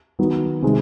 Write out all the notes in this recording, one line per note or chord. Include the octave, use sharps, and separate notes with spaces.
D#3 F#3 B3 D#4
C3 D#3 G#3